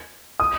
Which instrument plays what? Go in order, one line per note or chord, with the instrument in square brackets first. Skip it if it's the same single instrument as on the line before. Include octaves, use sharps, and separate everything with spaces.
[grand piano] D#6